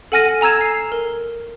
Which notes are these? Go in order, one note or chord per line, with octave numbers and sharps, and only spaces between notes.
A4 F#5 G#5 F6 A#6 D#7
G#5 A#5 E6 G#6 E7
C7
A#4